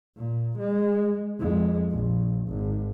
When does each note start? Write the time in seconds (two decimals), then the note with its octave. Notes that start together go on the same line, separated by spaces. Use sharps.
0.17 A#2
0.58 G#3
1.39 F2 G#3
1.91 A#1
2.48 G#1